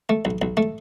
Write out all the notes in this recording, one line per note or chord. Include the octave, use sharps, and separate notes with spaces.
A3
B1
B1
A3